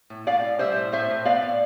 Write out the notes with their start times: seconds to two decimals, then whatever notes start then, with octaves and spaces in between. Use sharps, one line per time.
0.10 A2
0.27 A2 D5 F5
0.44 A2
0.59 G3 C5 E5
0.76 A2
0.92 A2 C5 E5
1.10 A2
1.25 B3 D5 F5
1.42 A2